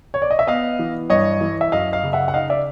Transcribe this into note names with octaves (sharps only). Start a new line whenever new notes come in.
C#5
D5
D#5
E5
B3 D#5 F5
E3
G2 C#5 D#5
E3
E5
F#2 D#5 F5
D#5 F5
C#3
E5 F#5
F#5
D#4 D#5 F5
D5 E5